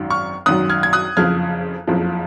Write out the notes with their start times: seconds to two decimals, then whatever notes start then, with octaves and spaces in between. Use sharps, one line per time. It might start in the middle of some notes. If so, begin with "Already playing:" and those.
Already playing: G#1 F#2 D#3 F#3
0.10 C#6 F6
0.46 G#1 F#2 D#3 F#3 D#6 F#6
0.70 F6 G#6
0.83 G#6
0.93 D#6 F#6
1.17 F#1 F2 C#3 F3 F6 G#6
1.87 F#1 F2 C#3 F3